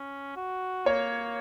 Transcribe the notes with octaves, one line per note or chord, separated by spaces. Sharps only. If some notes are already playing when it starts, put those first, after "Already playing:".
Already playing: C#4
F#4
A#3 C#5